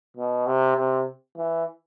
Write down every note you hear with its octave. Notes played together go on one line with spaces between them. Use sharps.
B2
C3
C3
E3